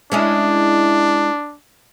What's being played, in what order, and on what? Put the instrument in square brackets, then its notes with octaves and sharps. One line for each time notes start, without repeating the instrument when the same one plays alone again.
[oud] G#3 C#4 E4 [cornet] D4